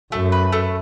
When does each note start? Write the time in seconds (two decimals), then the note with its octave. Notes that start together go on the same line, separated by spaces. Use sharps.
0.12 F#2 A3
0.32 B4
0.52 A3